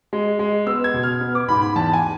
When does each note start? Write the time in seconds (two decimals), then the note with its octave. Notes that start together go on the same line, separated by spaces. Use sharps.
0.13 G#3
0.39 G#3
0.67 B3 E6
0.84 G#6
0.94 B2
1.03 F6
1.21 B3
1.35 D6
1.48 G#2 B5
1.62 B5
1.76 E2 A5
1.93 G#5